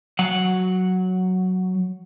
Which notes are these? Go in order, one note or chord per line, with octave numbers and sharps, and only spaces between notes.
F#3 F#5